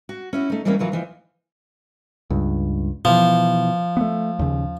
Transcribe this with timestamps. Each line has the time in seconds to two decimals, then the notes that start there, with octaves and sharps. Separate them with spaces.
0.09 F#4
0.33 C#4 E4 F#4
0.50 A3 D#4
0.65 E3 F#3 G3 A#3 C4 C#4
0.79 E3 F#3 F4 B4
0.92 D#2 E3 F3
2.30 C#2 G2
3.05 B2 E3 F3
3.97 A3 B3
4.39 D#2 C#3